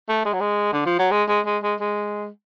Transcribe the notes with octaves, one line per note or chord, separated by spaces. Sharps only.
A3
G#3
F#3
G#3
D3
F3
F#3
G#3
G#3
G#3
G#3
G#3